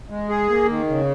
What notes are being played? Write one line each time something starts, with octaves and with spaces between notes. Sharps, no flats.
G#3
G#4
A#3
D#3
C#3